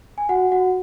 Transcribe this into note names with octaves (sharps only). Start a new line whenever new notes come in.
G#5
F#4 F#5
F#4 F#5